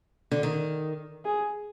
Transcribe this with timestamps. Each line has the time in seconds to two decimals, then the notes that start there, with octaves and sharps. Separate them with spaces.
0.31 D3
0.43 D#3
1.25 G#4